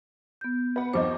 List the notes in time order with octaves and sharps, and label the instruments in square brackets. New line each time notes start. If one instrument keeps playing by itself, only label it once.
[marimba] B3 G6
[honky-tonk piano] B4 F#5
[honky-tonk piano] D#2 F3 D#4 [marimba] C5 D6